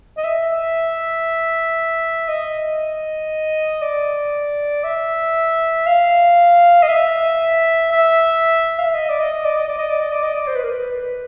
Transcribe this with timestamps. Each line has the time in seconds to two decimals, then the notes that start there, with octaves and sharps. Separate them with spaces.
0.17 D#5
0.24 E5
2.29 D#5
3.82 D5
4.84 E5
5.87 F5
6.83 D#5
6.89 E5
7.92 E5
8.79 F5
8.86 E5
8.94 D#5
9.10 D5
9.20 D#5
9.45 D5
9.56 D#5
9.68 D5
9.78 D#5
9.89 D5
10.01 D#5
10.12 D5
10.23 D#5
10.34 D5
10.47 C5
10.56 B4
10.63 A#4
10.70 B4